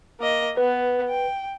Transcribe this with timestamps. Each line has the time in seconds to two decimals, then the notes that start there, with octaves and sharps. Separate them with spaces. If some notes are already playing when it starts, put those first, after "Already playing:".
0.20 A#3 D#5
0.57 B3 B4
1.08 G5